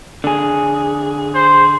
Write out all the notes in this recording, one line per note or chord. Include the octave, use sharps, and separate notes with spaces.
D3 G#4
C5